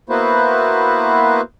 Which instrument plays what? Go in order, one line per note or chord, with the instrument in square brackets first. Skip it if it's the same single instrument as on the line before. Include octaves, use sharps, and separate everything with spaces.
[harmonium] A#3 B3 E4 F#4 B4 C5